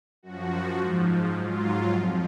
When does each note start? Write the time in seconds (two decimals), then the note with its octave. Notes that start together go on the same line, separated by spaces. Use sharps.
0.23 F#2 F3 F#4
0.78 G#2 F3
1.33 G#2 F#3 F4
1.90 F2 F3